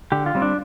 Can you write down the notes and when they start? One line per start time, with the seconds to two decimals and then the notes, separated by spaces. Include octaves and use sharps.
0.12 D3 G4
0.26 F4
0.35 G3 C4
0.42 D4